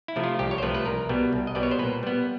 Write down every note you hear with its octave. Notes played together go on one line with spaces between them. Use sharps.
E4
C3 F3 A3
F4
C2 G4
C#5
C5
C3 F3 A3 B4
B4
C2 A#4
B2 G3 B3
C2
D#5
B2 G3 B3 D5
C#5
C5
A#2 B4
G3 B3